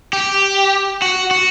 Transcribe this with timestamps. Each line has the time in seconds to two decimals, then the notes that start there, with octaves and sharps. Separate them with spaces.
0.13 G4
1.02 F#4
1.31 F#4